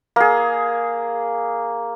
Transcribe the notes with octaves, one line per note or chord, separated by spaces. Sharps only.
A#3 G#4